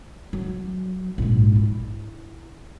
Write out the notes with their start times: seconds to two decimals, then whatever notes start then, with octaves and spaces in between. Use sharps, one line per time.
0.33 F#3
1.18 A#1 G#2
1.56 E4